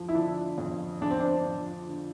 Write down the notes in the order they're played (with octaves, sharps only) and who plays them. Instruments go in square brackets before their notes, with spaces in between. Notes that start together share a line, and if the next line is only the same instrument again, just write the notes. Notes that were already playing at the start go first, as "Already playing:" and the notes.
Already playing: [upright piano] F2 F3
[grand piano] E4
[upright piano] D3 [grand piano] D4
[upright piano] F2
[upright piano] F2 [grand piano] D4
[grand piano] C4
D4
[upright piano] F3
D3